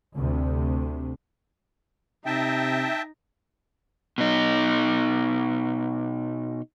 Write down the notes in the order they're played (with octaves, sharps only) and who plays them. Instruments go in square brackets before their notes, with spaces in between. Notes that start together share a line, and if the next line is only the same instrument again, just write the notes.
[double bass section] D2 C3
[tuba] C3 [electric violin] D#4 A#6 [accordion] E5 G5 A5
[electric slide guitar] B2 D#4